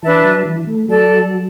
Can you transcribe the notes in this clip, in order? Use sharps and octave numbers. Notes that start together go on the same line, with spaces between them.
E3 D4 B4 E5 A5
F#3
E3
A3
F#3 A4 D5 A5